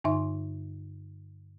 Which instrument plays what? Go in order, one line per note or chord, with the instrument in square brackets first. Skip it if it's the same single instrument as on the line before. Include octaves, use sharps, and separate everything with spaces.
[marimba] G2 D3 D#4 E5 C6